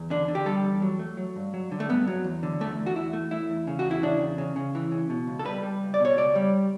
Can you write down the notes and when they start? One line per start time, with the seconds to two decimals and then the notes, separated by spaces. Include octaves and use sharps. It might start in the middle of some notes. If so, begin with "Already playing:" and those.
Already playing: E2
0.10 D3 D4
0.28 D3
0.35 G4
0.46 G3 A4
0.65 E2
0.82 F#3
0.99 A3
1.17 F#3
1.36 G2
1.54 F#3
1.72 D3
1.80 A3
1.89 G2 B3
2.08 F#3
2.24 E2
2.43 D3
2.60 E2 A3
2.78 E2
2.86 F#4
2.96 E2 E4
3.13 A3
3.31 A3 E4
3.50 E2
3.67 C#3
3.79 F#4
3.85 E2
3.91 E4
4.03 C#3 D4
4.21 E2
4.38 C#3
4.56 C#3
4.75 E3
4.92 C#3
5.10 B2
5.27 C#2
5.39 A4
5.45 G3 B4
5.63 G3
5.82 C#2
5.94 D5
6.00 B2 C#5
6.16 C#2 D5
6.36 G3